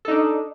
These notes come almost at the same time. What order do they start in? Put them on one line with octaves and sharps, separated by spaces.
A4 D#4 D4